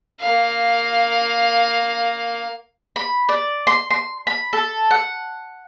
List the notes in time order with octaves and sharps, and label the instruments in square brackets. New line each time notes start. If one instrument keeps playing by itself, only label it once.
[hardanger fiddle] A#3 F5
[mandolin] B5
D5
C6
C6
B5
A4
F#5